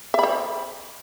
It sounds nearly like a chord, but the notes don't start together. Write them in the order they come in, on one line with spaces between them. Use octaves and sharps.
E5 B5 C5